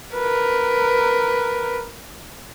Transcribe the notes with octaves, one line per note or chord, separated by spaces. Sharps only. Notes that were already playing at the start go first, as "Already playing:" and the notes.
A#4 B4